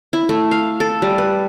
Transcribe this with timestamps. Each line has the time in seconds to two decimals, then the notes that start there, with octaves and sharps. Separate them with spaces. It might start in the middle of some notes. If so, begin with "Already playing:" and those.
0.13 E4
0.29 A3
0.51 F5
0.80 A4
1.02 G3
1.18 B4